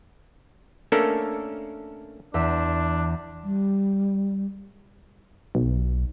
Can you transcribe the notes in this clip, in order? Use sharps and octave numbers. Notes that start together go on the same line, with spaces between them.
A3 A#3 C#4 D4 A4 A#4
E2 D4 E5
G3
B1